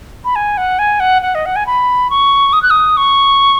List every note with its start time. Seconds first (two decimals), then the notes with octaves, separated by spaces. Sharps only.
0.25 B5
0.36 G#5
0.57 F#5
0.79 G#5
1.00 F#5
1.22 F#5
1.35 D#5
1.46 F#5
1.56 G#5
1.67 B5
2.10 C#6
2.53 D#6
2.63 F#6
2.70 D#6
2.97 C#6